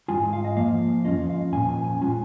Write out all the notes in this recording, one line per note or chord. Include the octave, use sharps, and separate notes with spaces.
G#2 F3 G#3 F4 G#5
F5
D#5
F2 F3 A#3 F5
F2 D#3 C#4 F4 D#5
F5
A#2 F3 C#4 G#5
G#5
G#5
G#3 C#4 F4 G#5